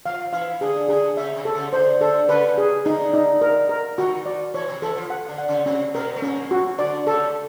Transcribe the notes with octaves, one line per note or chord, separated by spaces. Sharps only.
F3 F4 F5
E3 E4 F5
D3 D4 G#4
D3 D4 G#4
C#3 C#4 E5
C3 C4
A4
C#3 C#4
D3 D4 C5
D3 D4 A4
C#3 C#4 B4
G#4
D3 D4 D#4
D#4
A#4
A#4
D#3 D#4 F#4
D5
E3 E4 C#5
C3 C4
E3 E4 A4
F3 F4
F#5
D3 D4
F#5
C#3 C#4
C3 C4 C#4
B2 B3 A#4
A3
A#2 A#3 C#4
F#4
D3 D4 D5
C#3 C#4 A4